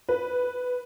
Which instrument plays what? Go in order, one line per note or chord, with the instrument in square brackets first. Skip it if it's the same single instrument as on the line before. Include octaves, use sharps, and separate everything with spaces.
[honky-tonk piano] B4